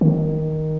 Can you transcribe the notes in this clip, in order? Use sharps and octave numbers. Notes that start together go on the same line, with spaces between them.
D#3